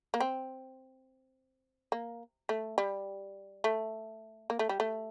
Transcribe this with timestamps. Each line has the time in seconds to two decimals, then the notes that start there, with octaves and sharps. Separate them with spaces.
0.14 A#3
0.21 C4
1.92 A#3
2.49 A3
2.78 G3
3.64 A3
4.50 A#3
4.59 A3
4.69 G3
4.80 A3